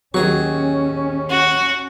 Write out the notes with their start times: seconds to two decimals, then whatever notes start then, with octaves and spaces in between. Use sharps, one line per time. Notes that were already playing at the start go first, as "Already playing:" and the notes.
0.14 D#2 F#3 C#4 G#4 C#6
1.30 F#4